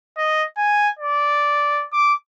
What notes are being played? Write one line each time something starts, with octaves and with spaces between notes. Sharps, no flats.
D#5
G#5
D5
D6